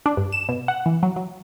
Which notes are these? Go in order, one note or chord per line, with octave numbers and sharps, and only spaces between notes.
D4
G2
E7
B2
F#5
E3
F#3
F#3